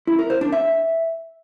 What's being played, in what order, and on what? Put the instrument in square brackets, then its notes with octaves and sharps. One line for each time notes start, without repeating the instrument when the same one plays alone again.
[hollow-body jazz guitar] E4
A#4
C5
D4
E5